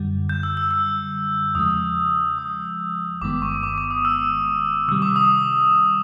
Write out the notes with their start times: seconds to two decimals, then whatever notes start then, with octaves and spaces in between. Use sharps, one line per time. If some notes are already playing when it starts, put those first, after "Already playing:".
Already playing: F#2 D3 G3
0.29 G6
0.43 E6
0.57 E6
0.71 E6
1.55 E2 C#3 F3 G#3 D#6
2.38 D#6
3.21 G1 G2 D#3 G#3 B3 D6
3.42 C#6
3.63 D6
3.78 D6
3.91 D#6
4.05 E6
4.88 C3 D#3 G3 E6
5.02 D6
5.16 D#6